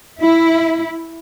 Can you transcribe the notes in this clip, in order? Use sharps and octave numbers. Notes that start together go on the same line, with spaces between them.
E4